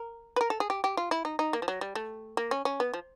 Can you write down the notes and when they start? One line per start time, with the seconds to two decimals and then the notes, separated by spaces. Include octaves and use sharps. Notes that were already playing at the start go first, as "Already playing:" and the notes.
Already playing: A#4
0.36 B4
0.41 A#4
0.50 A4
0.60 G#4
0.70 G4
0.84 G4
0.97 F4
1.11 E4
1.25 D#4
1.39 D#4
1.53 A#3
1.62 F3
1.68 F#3
1.81 G3
1.95 A3
2.37 A#3
2.51 C#4
2.65 C#4
2.80 B3
2.94 F3